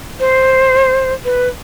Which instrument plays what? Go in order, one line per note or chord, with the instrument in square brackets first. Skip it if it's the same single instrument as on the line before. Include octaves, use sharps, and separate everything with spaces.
[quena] C5
B4